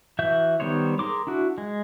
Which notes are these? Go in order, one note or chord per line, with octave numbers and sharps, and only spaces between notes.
E3 F#4 E5 G6
D#3 G3 B3 C5 C#5
G#4 A#4 C6 D6
D4 E4 F#4
G#3